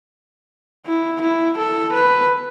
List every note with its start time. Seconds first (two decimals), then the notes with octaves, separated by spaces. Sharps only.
0.86 E4
1.21 E4
1.58 A4
1.93 B4